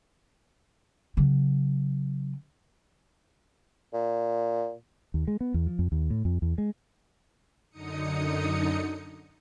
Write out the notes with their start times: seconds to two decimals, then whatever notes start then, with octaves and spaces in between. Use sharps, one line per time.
1.17 C#3 F#3
3.93 A#2
5.14 D#2
5.28 G#3
5.41 B3
5.54 E2
5.67 F3
5.79 F2
5.92 D#2
6.10 A2
6.25 F2
6.42 E2
6.58 G#3
7.70 F#2 D3 D#4 D#6 C#7